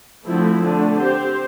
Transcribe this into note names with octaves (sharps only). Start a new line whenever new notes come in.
D3 F3 A3 C4 E4
D3 A3 D4
C4 G4 C5